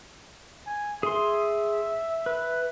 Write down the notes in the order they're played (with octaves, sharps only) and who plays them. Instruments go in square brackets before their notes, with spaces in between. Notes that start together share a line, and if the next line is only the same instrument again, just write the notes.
[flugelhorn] G#5
[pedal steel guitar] G#4 C6 [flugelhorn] E5
[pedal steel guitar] B4